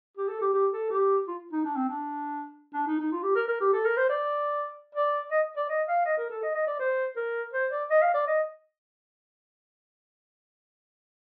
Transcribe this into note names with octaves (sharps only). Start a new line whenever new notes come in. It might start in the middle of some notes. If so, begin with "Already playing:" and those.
G4
A4
G4
G4
A4
G4
F4
D#4
D4
C4
D4
D4
D#4
D#4
F4
G4
A#4
A#4
G4
A4
A#4
C5
D5
D5
D#5
D5
D#5
F5
D#5
A#4
A4
D#5
D#5
D5
C5
A#4
C5
D5
D#5
F5
D5
D#5